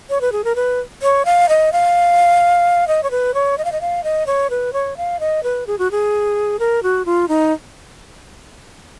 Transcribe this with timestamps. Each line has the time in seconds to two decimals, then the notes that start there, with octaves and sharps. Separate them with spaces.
0.10 C#5
0.21 B4
0.32 G#4
0.44 A#4
0.56 B4
1.02 C#5
1.25 F5
1.49 D#5
1.72 F5
2.88 D#5
3.03 C#5
3.11 B4
3.34 C#5
3.58 D#5
3.65 F5
3.72 D#5
3.81 F5
4.04 D#5
4.26 C#5
4.50 B4
4.73 C#5
4.97 F5
5.20 D#5
5.43 B4
5.67 G#4
5.78 F#4
5.91 G#4
6.59 A#4
6.83 F#4
7.05 F4
7.28 D#4